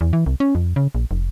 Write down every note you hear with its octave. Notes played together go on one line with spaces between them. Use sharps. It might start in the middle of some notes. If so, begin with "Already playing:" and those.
E2
E3
C2
C#4
F2
C#3
A#1
F1